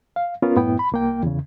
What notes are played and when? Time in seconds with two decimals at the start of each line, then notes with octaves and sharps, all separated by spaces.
0.16 F5
0.42 B3 C#4 F4 A#4
0.56 F#2 A2 B3 E4 G5
0.79 B5
0.92 C2 A#3 G5
1.23 E2 C#3